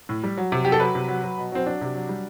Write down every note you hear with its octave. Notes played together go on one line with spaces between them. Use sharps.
A2
G3
F#3
C3
F#3 G4
A4
F#3 B4
C3
F#3
F#3
B2
F#3 C4
F#3 D4
C3
F#3
G3